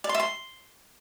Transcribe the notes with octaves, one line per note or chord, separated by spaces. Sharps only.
D5
C6
E5
C6